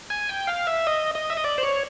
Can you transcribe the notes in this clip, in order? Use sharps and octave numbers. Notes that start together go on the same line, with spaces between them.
G#5
G5
F5
E5
D#5
D#5
E5
D#5
D5
C5
C#5